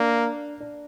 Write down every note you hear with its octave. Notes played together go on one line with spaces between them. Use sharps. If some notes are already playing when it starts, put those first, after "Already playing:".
Already playing: A#3 D4
D4